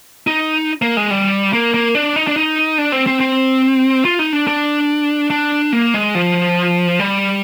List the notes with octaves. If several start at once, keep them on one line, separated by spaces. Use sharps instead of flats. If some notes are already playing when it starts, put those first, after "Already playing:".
D#4
A#3
G#3
G3
A#3
A#3
D4
D#4
D4
D#4
D4
C4
C4
C4
F4
D#4
D4
D4
D4
A#3
G#3
F3
G3